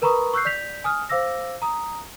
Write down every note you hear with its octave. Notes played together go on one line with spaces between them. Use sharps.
A#4 B4 A#5 B5 C#6 D#6
C#6 E6 F#6 G6 C7
D5 G6 B6 F7
G#5 D#6 F6
C5 F5 D6 E6 A#6
A#5 D#6